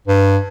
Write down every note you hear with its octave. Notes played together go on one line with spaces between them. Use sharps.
G2